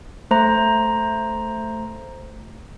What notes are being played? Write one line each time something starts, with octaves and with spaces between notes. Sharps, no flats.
A3 C5 A#5